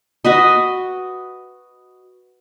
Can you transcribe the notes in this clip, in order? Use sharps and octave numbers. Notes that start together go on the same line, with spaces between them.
F#4 B4 D#5